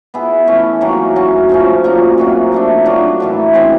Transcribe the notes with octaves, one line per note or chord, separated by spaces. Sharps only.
B3 E4 G#4
E3 A3 C#4
D#3 F#3 A#3
F#3 A3 C#4 F#4
C#3 F3 A3 C#4
A#2 F#3 A#3 D#4
C3 D#3 F#3
F3 A3 D4
F#3 A#3 D4
A2 E3 A3
C#3 E3 G#3 C4